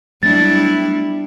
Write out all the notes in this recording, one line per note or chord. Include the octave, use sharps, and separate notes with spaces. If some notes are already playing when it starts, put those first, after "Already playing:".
F#3 G3 A3 B3 D4 E4 A6